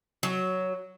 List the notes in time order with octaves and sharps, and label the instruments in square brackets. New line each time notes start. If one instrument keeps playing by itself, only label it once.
[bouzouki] F#3